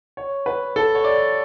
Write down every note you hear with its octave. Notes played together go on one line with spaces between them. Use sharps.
C#5
B4
A4
C#5
D5